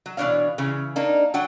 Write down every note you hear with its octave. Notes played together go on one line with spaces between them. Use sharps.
F#3
B2 E3 B3 D4 C#5 F5
C#3 E3
A#3 D4 D#4
F#3 D4 F#5 G5